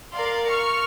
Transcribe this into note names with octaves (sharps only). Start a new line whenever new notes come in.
A#4 D5 F5 C6
C#6 F6 C#7